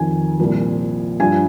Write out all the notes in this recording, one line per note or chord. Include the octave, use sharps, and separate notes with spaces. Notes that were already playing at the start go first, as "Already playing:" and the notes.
Already playing: F2 D#3 G#5
C2 A#2 F3
G2 F3 G#5